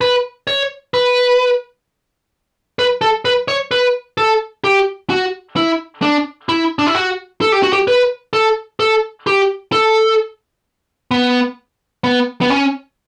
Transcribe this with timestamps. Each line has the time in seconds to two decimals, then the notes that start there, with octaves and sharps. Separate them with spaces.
0.01 B4
0.47 C#5
0.94 B4
2.79 B4
3.01 A4
3.25 B4
3.48 C#5
3.71 B4
4.18 A4
4.64 G4
5.10 F#4
5.56 E4
6.02 D4
6.49 E4
6.79 D4
6.87 E4
6.95 F#4
7.41 A4
7.52 G4
7.63 F#4
7.73 G4
7.88 B4
8.33 A4
8.80 A4
9.27 G4
9.72 A4
11.11 B3
12.04 B3
12.41 B3
12.50 C#4